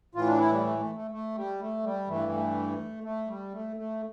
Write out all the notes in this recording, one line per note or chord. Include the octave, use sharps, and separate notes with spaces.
A2 E3 F4
D4
E4
G3
A3
A3
A3
A3
G3
A3
G3
G2 E3 A3
A3
A3
G3
A3
A3